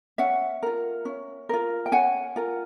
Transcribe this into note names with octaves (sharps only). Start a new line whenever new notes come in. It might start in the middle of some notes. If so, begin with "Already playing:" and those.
C#4 E5 F#5
F4 A#4
C#4
F4 A#4
G5
C#4 F#5 G#5
F4 A#4